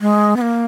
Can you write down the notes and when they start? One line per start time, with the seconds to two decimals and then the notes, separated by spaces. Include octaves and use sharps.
0.01 G#3
0.37 B3
0.41 A#3